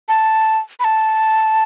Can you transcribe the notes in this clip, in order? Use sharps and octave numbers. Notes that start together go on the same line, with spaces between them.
A5
B5
A5